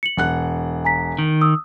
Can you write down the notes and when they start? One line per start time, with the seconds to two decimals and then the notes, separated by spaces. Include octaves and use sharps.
0.03 C#7 F#7
0.17 E1 F#5 F#6
0.85 G#5 A#5 B6
1.19 D#3
1.41 D#6 E6